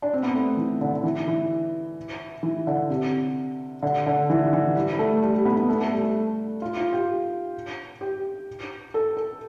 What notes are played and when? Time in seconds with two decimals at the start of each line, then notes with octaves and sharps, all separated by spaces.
0.02 D4
0.13 C4
0.23 B3
0.34 A3
0.57 E3
0.81 D3
0.93 D3
1.03 E3
1.28 E3
2.43 E3
2.67 D3
2.90 C3
3.83 D3
4.06 D3
4.30 E3
4.53 E3
4.75 G3
4.93 G3
4.99 A3
5.22 G3
5.34 G3
5.45 B3
5.57 B3
5.69 A3
5.81 A3
5.92 G3
6.03 A3
6.62 F4
6.77 F4
6.92 G4
8.01 G4
8.94 A4
9.17 A4